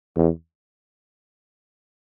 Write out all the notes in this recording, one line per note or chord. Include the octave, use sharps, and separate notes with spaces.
E2